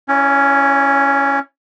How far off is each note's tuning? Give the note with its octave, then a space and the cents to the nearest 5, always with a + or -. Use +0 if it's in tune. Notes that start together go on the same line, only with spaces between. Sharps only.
C#4 +0 E4 +0 C#5 +45